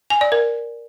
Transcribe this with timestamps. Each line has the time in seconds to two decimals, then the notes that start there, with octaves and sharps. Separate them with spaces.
0.10 G#5
0.21 D5
0.32 A#4